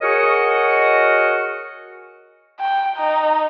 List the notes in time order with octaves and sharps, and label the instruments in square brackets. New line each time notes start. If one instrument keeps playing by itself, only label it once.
[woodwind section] F#4 G#4 A#4 C#5 D#5
[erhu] G5
D#4